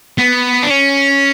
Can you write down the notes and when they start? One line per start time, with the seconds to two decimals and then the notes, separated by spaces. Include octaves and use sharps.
0.18 B3
0.63 D4
0.70 C#4